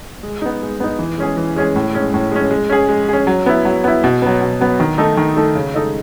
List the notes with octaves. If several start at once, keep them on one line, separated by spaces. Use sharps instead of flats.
G#3
B3 D#4
G#3
B3 D#4
E3
G#3 C#4 G#4
E3
G#3 C#4 G#4
A2
G#3 C#4
A2
G#3 C#4
G#3
C#4 G#4
G#3
C#4 G#4
F#3
B3 E4
F#3
B3 E4
B2
F#3 B3
B2
F#3 B3
D#3
A3 D#4 A4
D#3
A3 D#4 A4
C#3
G#3 D#4 A4 D#5